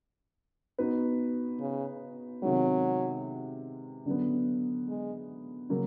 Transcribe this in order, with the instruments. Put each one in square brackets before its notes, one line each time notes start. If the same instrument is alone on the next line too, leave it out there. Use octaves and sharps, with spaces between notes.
[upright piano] B3 D#4 F#4 B4
[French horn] C#3
[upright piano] C3 D#3 G#3 [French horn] F#3
[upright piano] D3 F#3 B3
[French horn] G#3
[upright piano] C#3 F#3 A#3